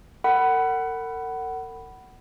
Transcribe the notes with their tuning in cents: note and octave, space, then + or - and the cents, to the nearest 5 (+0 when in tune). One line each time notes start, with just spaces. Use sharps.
A#4 -40 F#5 +20 B5 +0